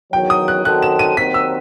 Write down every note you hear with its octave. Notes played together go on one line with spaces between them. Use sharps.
E2 D#3 F#3 G5
D#6
F#6
D#3 F#3 C4 F#4 A4 F#6
E7
D#7
D#2 D#3 F#3 C4 B6
E6